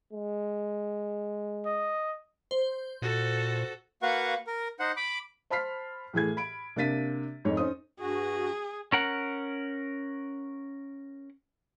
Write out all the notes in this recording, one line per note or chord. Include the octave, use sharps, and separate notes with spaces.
G#3
D#5
C5
A#2 F#4 A4
A#3 F#4 B4 F5 F#5 C#6
A#4
D#4 C5 F#5
B5 D6
C5 A5 B5 F6 B6 C7
A2 E3 G#4 G#6
B5 D7
C3 A#3 D4 A6 B6 D#7
F2 G#2 G#3 C#5
C#4 D#4 C5 D#6
G2 F#4 G#4
C#4 A#4 F#5